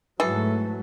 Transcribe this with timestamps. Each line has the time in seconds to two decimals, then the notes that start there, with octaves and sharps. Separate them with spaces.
0.20 G#2 E3 F#3 A3 G#4 A4